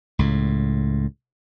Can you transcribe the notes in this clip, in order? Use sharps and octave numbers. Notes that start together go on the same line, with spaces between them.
C#2 A2